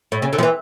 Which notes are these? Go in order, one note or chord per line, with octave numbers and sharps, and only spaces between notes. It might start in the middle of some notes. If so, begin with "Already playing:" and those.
A2
C#3
D3
F3
E3